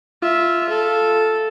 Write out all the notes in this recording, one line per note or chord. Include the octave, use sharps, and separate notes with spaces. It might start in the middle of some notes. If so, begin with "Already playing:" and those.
F4 E5
A4